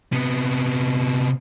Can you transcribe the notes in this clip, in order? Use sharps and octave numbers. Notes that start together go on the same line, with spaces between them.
C3 B3